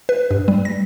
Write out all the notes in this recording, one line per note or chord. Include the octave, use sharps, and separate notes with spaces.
B4
G2
G3
A#6